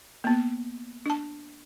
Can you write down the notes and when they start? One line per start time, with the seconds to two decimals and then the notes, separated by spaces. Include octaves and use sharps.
0.24 A#3 B3
1.06 D4 A5